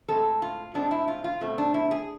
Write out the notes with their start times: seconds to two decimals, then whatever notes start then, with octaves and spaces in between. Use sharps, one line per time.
0.08 A2 G#3 C4 A4
0.42 F4
0.74 A2 G#3 C4 D4
0.91 E4
1.08 F4
1.24 F4
1.41 B2 A3 C4
1.58 D4
1.74 E4
1.91 G#4